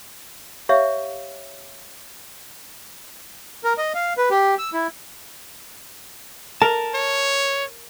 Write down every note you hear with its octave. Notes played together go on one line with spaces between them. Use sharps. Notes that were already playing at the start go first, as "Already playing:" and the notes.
G4 C#5 E5 F5
A#4
D#5
F5
B4
G4
E6
E4
A#4 A5
C#5